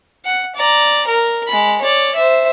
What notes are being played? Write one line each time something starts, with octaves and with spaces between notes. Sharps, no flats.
F#5
D5 A#5
A#4
G#3 B5
C#5 D5
C5 E5